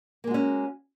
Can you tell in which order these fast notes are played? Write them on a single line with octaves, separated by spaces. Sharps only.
A#3 G#3 F#4 C#4